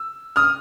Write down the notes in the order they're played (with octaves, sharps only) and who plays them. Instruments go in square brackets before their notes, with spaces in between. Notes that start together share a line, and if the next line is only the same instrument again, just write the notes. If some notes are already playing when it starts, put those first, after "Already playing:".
Already playing: [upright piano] E6
D#6 F6